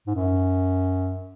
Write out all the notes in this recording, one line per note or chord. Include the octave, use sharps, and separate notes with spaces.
G#2
F#2